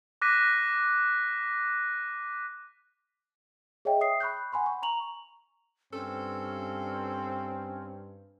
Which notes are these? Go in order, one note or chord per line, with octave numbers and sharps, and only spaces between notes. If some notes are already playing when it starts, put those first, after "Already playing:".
D6 F#6 A#6 B6 D#7
G#4 C#5 D#5 E5 G5
E5 G5 D#6 C7
B5 C#6 F#6 G6
F#5 G#5 B5 C6
C#6
A#5 C#6 F7 F#7
G2 C4 C#4 A4